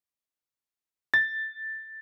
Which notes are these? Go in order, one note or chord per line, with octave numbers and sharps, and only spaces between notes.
A6